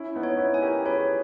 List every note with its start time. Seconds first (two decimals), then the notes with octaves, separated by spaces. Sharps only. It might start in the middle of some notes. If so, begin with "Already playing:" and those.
Already playing: C#4 E4
0.15 B3 D#4
0.23 C#5
0.39 C#4 E4
0.54 G#5
0.62 G4 A#4
0.85 G#4 B4 C#5